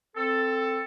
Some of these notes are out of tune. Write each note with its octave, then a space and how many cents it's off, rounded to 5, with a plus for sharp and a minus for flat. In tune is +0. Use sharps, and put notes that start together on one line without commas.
C4 +0 A4 +10